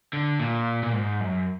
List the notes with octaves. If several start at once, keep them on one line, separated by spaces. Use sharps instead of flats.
D3
A#2
A#2
G#2
F#2